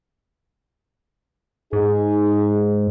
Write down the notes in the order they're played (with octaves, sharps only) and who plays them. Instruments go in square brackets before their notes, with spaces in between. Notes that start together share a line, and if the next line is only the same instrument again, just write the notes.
[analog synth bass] G#2 [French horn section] D#4 G#4